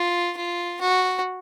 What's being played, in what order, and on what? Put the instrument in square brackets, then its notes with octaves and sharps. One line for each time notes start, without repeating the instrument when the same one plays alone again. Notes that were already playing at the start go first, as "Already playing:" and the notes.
Already playing: [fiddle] F4
F4
F#4